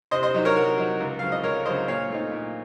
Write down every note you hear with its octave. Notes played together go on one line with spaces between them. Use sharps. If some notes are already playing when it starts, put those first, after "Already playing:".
C3 C5 D#5
C5 D#5
F#3 C4 D#4
A#4 C#5
C3 F#4 A#4
F#3 C4 D#4
C#2
C#3 F#3 C4 F5
D#5
C#2 A#4 C#5
C#3 F#3 C4 C5 D#5
A#2 C#5 F5
A3 C4 D#4
A#2